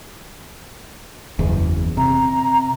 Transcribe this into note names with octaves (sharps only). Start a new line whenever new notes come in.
F#1 E2
C3 A#5